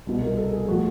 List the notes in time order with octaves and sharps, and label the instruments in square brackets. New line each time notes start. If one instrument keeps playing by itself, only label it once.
[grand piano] C2 B2
A#4
A4
G#4
A2 F3 F#4